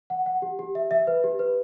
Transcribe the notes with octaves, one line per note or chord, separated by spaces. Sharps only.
F#5
F#5
G4
G4
E5
E5
B4
G4
B4